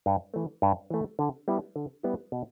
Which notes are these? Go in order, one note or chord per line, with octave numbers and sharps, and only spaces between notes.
G2
E3 A3
G2
E3 A3
D3
G3 B3 E4
D3
G3 B3 E4
B2